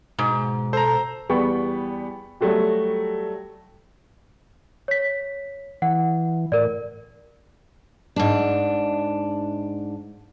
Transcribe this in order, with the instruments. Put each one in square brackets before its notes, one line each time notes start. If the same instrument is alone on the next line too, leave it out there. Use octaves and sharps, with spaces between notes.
[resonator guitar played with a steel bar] G#2 [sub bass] B2
[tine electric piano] A4 [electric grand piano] C5 A#5
[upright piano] E2 G3 B3 G5 B5 C#6
F#3 G3 A3 F#4 G4
[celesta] C#5 B6
[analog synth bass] E3 [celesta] F#5
[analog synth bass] A2 [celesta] A#4 D5
[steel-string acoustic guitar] G#2 D4